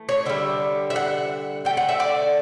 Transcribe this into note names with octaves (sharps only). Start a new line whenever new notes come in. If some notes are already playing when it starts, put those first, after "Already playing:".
Already playing: E3 A3
C#5
D3 G3 E5
E5
F#5
D3 A3 G5
F#5
E5
D5